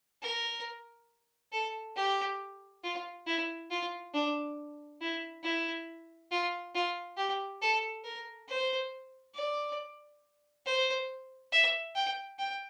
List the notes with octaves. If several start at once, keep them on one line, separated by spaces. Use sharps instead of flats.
A#4
A4
G4
F4
E4
F4
D4
E4
E4
F4
F4
G4
A4
A#4
C5
D5
C5
E5
G5
G5